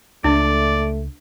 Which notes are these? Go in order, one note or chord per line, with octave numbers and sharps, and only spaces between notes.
C#2 A3 D4 D5